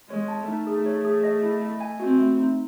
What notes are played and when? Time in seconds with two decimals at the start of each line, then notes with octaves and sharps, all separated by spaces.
0.10 G#3 C#5
0.28 A5
0.48 A3 D#4
0.67 G#4
0.86 C#5
1.05 G#4
1.24 D#5
1.43 E4
1.63 D#5
1.81 G#5
2.00 C4 F#4
2.19 A3
2.38 D#4